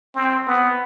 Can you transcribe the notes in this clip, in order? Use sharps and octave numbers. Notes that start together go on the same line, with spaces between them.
C4
B3